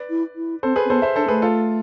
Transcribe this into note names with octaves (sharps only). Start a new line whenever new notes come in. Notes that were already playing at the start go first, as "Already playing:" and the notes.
Already playing: B4 D5
E4
E4
C4 A4 C5
G#4 B4
C4
B3 A4 C5
C5 E5
D4 A4 C5
A3 G#4 B4
F4 A4